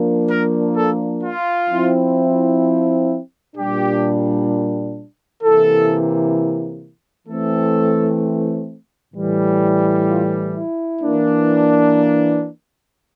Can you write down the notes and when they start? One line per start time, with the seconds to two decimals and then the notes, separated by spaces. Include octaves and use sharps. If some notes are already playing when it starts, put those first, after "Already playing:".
Already playing: F3 A#3 D4
0.30 A#4
0.77 A4
1.23 F4
1.70 F3 C4 E4
3.56 A#2 G3 D4 G4
5.42 C3 E3 A#3 E4 A4
7.28 E3 A3 C4 A4
9.14 A2 E3 G3
10.08 F4
10.54 E4
11.00 E3 A#3 D4